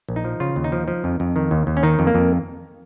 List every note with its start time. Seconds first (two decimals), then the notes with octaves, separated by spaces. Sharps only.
0.09 A#1
0.16 D#4
0.24 F3
0.40 C#3 F4
0.56 D#2
0.64 D#4
0.72 F3
0.88 F3
1.04 F2
1.20 F2
1.36 D#3
1.51 D#2
1.67 D#2
1.77 C#4
1.83 D#3 D#4
1.99 F2
2.07 A#3
2.15 F2